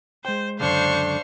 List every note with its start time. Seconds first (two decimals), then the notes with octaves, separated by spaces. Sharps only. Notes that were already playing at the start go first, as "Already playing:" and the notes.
0.25 G#3 C5 G5
0.60 C#2 F#2 D3 D4 C5 F5 C#6